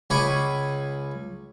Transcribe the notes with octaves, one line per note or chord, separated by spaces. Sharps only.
C#2 G#5 B5 C#6 D6